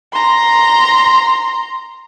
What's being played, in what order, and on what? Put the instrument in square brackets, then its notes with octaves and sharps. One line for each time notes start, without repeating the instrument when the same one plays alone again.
[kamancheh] A#5 C6